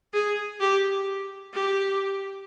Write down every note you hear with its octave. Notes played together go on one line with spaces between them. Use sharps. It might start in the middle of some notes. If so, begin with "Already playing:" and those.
G#4
G4
G4